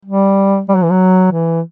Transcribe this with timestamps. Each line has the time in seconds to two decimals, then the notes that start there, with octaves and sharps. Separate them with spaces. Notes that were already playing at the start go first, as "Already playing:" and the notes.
0.05 G3
0.69 G3
0.75 F#3
0.83 E3
0.91 F#3
1.32 E3